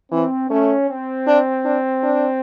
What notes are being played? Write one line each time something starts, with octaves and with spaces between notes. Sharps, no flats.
E3 C4
A3 C#4
C4
D4
D4
D4